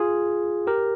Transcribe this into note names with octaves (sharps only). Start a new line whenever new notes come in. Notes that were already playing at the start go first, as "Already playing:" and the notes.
Already playing: F4 G#4
G4 A#4